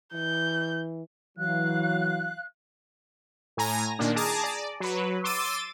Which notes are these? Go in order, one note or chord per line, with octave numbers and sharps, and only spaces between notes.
E3 G6
E3 F#3 F5 F#6
A2 G#5 A#5 A#6
A#2 D#3 A#3 D4
G#4 A5 A#5 D6 D#6
D5
F#3 B4
C6 D6 E6 A6 D#7